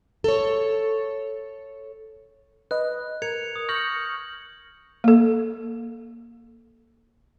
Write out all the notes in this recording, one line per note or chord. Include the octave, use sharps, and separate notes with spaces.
A4 C#5
B4 D#5 F#6
A#4 G#6 C#7 F7
D#6
C#6 F6 G6 A#6 C#7 F#7
A#3 A4